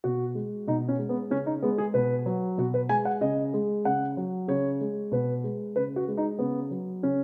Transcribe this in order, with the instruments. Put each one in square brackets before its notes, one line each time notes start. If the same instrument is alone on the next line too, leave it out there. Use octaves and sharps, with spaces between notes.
[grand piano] B2 F#4
G#3
B2 D#4
C#4
G#3
B3
C#3 C#4
D#4
G#3 B3
G#4
B2 B4
F#3
B2 F#4
B4
G#3 G#5
F#5
C#3 D#5
G#3
C#3 F#5
F#3
C#3 C#5
G#3
B2 B4
G#3
C#3 B4
F#4
G#3
D#4
C#3 B3
F#3
C#3 C#4